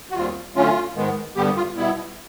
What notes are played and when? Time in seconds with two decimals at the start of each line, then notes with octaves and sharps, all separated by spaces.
0.11 F#4
0.15 D#2 D#3 G3 C4 F4
0.55 D3 F#3 A3 C#4 F4
0.96 G#2 D#3 G#3 B3
1.36 G2 D3 G3 B3 G4
1.56 F4
1.77 B2 G3 B3 E4